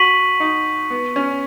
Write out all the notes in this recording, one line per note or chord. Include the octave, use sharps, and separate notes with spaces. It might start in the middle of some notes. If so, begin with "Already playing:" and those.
Already playing: F#4 C#6 B6 D#7 F#7
D#4
B3
C#4